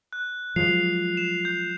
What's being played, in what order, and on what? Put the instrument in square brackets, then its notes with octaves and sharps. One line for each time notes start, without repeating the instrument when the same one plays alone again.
[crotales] F#6
[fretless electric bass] F3 F#3 G#3 [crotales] C7 F7
[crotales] E7
G6